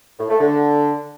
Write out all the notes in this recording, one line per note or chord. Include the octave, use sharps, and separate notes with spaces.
A2
A3
D3